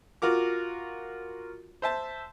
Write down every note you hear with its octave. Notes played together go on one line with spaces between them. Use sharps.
F4 F#4 A#4 D6
C5 E5 A5